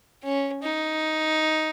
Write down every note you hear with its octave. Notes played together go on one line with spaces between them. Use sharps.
C#4
D#4